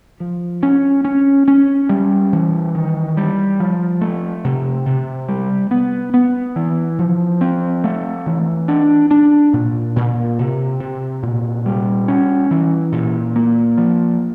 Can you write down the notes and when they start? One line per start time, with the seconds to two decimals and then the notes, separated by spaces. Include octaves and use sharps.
0.20 F3
0.63 C#4
1.05 C#4
1.48 C#4
1.89 G3
2.33 E3
2.75 D#3
3.17 G3
3.60 F3
4.01 A3
4.44 C3
4.86 C3
5.28 G3
5.71 B3
6.14 B3
6.56 E3
6.99 F3
7.41 C4
7.84 A3
8.26 E3
8.68 D4
9.11 D4
9.53 A#2
9.96 A#2
10.39 C3
10.80 C3
11.23 A#2
11.66 G3
12.08 C#4
12.51 E3
12.92 A#2
13.36 A#3
13.78 F3